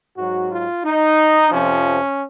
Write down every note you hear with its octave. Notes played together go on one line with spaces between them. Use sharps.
G#2 F#3 F#4
F4
D#4
F2 C3 F3 C#4